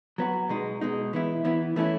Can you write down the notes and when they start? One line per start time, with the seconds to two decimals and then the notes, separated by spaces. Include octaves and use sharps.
0.18 F#3 B3 F#4
0.49 B2 G#3 D#4
0.81 B2 G#3 D#4
1.13 E3 B3 E4
1.45 E3 B3 E4
1.76 E3 A3 C#4 E4